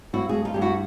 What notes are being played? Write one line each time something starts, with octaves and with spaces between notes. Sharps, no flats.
G2 E4 F#4
F#4 G#4
A3
D#4 F4
G2 G4
E4 F#4